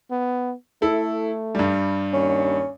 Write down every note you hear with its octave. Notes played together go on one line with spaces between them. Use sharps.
B3
A3 E4 A4
G2 G3
D#2 C#4